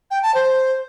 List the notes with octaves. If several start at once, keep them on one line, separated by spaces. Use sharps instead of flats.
G5
A5
C5